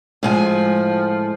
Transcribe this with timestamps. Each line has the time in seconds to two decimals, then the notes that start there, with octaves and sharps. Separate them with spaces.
0.23 A2 F3 G#3 G#5